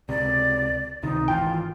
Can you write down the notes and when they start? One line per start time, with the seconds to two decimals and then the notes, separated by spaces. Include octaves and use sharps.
0.09 C#2 C3 D5
1.03 C#2 C3 D#3 D#4
1.28 G#1 E3 F4 G5